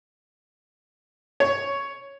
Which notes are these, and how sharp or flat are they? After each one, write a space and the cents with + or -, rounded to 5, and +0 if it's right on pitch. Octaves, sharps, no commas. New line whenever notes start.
C#5 +5